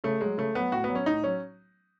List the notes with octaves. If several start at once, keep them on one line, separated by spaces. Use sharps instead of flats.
C#3 A3
F#3 G#3
C#3 A3
F#3 B3
A2 F#4
B3
F#3
C#4
A2 D#4
F#3 C#4